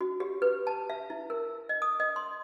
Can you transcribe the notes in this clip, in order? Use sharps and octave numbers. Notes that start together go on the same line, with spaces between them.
F#4
G4
B4
A5
E5
E4
A#4
D#5
D#6
D#5
C6